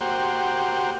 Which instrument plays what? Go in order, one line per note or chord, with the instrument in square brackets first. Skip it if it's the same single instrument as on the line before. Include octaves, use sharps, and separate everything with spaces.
[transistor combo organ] A#3 F#4 G4 C5